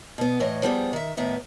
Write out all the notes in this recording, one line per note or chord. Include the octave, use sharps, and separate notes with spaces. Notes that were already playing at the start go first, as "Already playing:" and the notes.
B2 B3
A2 E3 C#5 D#5
F3 G3 B3 G4 G#4
D#3 E5
A2 D#3 B3 E5